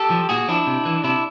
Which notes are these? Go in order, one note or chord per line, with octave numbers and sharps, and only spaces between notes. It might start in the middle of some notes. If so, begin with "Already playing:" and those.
Already playing: G4 A4
F3
A#2 F#4 G#4
F3 D4 E4
C3
E3
C3 D4 E4